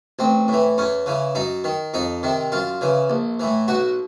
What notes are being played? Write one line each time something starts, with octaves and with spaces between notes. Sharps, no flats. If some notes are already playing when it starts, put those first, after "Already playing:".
A1 C4
A2 E3
E2 C#4
C#3 E3
F#2 D#4
D#3
F2 D#4
C3 D#3
F#2 F4
C#3 E3
A#1
A2 E3
B1 F#4